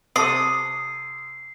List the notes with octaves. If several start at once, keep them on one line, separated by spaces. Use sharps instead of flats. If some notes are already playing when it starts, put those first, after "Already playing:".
C3 A4 D6 D#6 C7